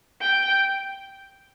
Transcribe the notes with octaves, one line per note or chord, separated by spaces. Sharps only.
G5